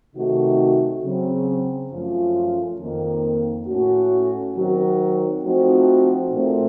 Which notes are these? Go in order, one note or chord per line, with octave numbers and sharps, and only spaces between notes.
C3 D#3 A3 D#4 F#4
C#3 F#3 C4
F#2 F3 A3 C#4 F4
F2 D#3 A#3
A2 A3 C#4 F#4
D#3 F#3 C4 F#4
F3 A3 C4 D#4 F#4
A#2 A3 C4